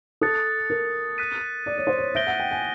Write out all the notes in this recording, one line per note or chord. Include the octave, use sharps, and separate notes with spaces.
A4 D#6 F#6 A6 C#7
A#4
F#6 B6 D#7
D5
C#5
C5
C#5
E5 G6 A#6 D7 G7
F#5
G5
G#5